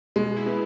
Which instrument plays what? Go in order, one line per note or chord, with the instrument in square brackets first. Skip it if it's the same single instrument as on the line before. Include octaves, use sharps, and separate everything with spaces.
[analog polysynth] B2 [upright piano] G#3
[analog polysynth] E4
[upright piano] B3